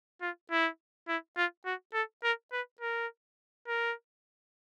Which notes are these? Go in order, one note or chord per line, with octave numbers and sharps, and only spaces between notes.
F4
E4
E4
F4
F#4
A4
A#4
B4
A#4
A#4